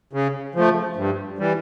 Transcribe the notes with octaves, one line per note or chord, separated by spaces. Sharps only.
C#3
F3 A3
G2
E3 G3